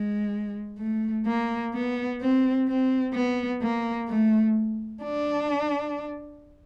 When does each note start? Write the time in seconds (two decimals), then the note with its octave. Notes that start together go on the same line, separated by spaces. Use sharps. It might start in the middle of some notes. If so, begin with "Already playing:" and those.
Already playing: G#3
0.79 A3
1.27 A#3
1.74 B3
2.21 C4
2.68 C4
3.14 B3
3.62 A#3
4.09 A3
5.04 D4